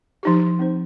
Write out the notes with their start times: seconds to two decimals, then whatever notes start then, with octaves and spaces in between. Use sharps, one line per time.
0.23 F3 D#4 G4
0.59 C4 D#4 C5